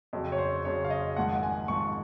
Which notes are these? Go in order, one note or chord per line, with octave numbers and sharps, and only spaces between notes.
F2 C#3 F#3
C#5
C5
F2 C#3 F#3 C#5
F5
D#5
G#1 G#2 F3 F#5
G#5
G#1 G#2 F3 C#6